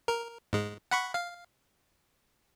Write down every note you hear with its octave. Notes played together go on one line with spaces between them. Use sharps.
A#4
G#2 G#3
F#5 B5 C#6
F5